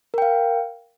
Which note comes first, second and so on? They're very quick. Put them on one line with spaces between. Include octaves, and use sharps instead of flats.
A#4 G5 F5